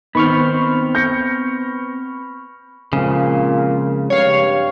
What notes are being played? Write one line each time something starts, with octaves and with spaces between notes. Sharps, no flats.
D#3 B3 C4 B5 C#6 F6
G6 A#6 C#7
A#2 C#3 F3 G#3 C4
G2 C#5 F5